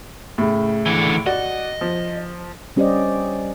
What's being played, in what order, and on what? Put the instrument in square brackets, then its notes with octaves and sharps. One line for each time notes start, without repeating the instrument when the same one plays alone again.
[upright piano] A2 C#3
[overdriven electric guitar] D3 E3
[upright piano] F#4 D5 [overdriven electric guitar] D#5
[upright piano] F3
[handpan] G3 C#4 G4 C5 D5 D#5